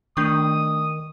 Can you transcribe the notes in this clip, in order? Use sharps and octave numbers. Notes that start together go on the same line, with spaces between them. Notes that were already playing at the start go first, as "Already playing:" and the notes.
D#3 A3 D4 C#6 D#6